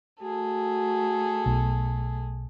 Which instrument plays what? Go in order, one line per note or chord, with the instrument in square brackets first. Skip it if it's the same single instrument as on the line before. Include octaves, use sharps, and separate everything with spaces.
[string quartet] A3 G#4 A4 [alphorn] F#4
[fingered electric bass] B1